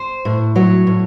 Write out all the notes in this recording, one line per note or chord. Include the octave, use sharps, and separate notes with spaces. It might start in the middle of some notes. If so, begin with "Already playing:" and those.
Already playing: C5
A2
F#3 C#5
A2